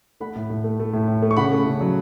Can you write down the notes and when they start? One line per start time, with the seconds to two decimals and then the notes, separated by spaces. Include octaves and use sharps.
0.20 A3 F#5 B5
0.36 A2
0.50 A2
0.64 A3
0.80 A3
0.93 A2
1.08 A2
1.22 A3
1.31 C#6
1.37 C#3 F#5 B5
1.52 A3
1.66 C#3
1.81 F#3